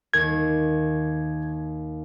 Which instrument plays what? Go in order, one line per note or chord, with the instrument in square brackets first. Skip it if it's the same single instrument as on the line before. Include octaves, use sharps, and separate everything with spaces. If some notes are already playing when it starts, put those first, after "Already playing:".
[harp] D#2 [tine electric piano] G#6